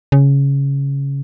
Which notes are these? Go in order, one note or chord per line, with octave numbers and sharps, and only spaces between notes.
C#3